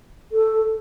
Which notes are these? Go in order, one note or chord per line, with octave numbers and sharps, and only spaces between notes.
A4